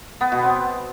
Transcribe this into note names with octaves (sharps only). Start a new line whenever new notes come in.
B3
B2
C4